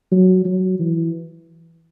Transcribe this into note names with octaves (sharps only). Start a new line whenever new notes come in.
F#3
F#3
E3